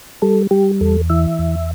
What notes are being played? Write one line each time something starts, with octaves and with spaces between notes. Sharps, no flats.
G3 A4
G3 G4
E2 A4
E3 E5
E2